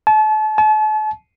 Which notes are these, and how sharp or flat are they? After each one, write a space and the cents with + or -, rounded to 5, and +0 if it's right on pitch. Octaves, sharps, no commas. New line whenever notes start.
A5 -35
A5 -40